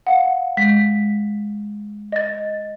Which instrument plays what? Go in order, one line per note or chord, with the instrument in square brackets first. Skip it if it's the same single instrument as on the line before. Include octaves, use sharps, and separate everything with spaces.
[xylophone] F5 F#5
[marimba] G#3 [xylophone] B6
[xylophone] D#5 A6